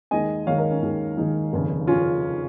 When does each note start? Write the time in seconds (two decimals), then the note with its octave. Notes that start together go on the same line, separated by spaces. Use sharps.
0.11 D#2 D#3 G#3 D#5 G#5
0.47 D#2 D#3 G#3 C#5 F5
0.58 A#4 D#5
0.71 C#4
0.82 D#2 D#3 G#3
1.17 D#2 D#3 G#3 D#4
1.53 F1 D#2 C#3
1.87 C#3 C#4 F4